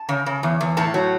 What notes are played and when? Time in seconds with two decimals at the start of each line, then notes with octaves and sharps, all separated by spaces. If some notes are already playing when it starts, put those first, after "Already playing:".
Already playing: A5
0.09 C#3
0.26 C#3
0.43 E2
0.61 E2
0.77 A2 A5
0.94 F#3